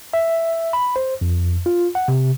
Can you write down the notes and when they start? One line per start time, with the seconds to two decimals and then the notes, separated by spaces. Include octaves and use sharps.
0.13 E5
0.73 B5
0.96 C5
1.21 F2
1.66 F4
1.95 F#5
2.08 C3